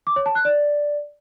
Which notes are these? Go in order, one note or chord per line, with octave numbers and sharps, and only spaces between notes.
D6
C#5
A5
F#6
D5